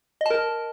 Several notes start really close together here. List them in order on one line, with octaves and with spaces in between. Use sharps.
D#5 A5 A#4